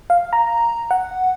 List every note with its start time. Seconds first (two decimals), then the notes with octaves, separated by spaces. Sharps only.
0.10 F5
0.33 A#5
0.91 F#5